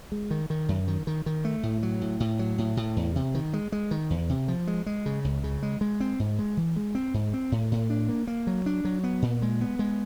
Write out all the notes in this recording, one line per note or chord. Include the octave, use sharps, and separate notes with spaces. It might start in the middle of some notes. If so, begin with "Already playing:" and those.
G#3
D#3
D#3
F#2
D#3
D#3
D#3
A3
A2
F#3
A2
A2
F#3
A2
A2
E2
C3
D#3
G#3
G#3
D#3
E2
C3
F3
G#3
G#3
C#3
C#2
C#3
G#3
G#3
C4
G#2
G#3
E3
G#3
C4
G#2
C4
A2
A2
D4
A#3
A#3
F#3
D4
F#3
B3
A#2
G#3
B3
G#3